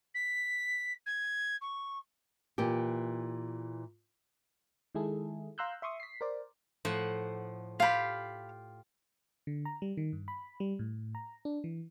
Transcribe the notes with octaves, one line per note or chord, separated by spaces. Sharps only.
B6
G#6
C#6
A#2 E3 G4
D#3 G#3 E4 G#4 A4
F5 A#5 C6 E6 F#6 G6
E5 C6 C#6 D#6
B6 C7
A#4 C5 D5
A2 F3 F#5
F4 G4 F5 B5
D3
A#5
G3
D#3
G2
B5
G3
A2
A#5
D4
E3